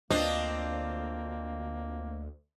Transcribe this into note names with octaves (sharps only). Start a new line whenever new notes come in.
D2 A#3 C4 D4 F4 D#5